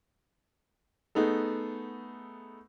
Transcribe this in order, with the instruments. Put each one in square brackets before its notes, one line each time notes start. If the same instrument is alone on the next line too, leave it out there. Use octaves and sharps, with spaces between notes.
[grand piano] A3 B3 D#4 G#4 A4